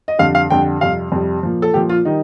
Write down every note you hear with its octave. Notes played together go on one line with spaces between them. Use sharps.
D#5
F2 D3 G3 F5
F5
F2 D3 G3 G5
F2 C3 G3 F5
F2 C3 G3
A#2 F3
A4
A#2 F3 G4
F4
D#3 G3 D#4